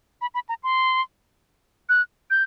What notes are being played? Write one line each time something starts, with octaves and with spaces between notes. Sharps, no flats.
B5
B5
A#5
C6
F#6
G6